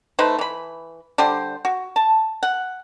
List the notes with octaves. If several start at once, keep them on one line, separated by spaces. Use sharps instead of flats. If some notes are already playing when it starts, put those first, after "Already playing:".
A3 D#4 B4 C5
E3 B5
D3 G3 C5 C6
F#4
A5
F#5